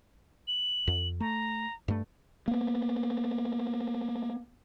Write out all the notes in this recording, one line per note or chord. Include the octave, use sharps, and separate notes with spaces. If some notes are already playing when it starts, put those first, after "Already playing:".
F#7
F2
A3 A#5
G2 A3
A#3 B3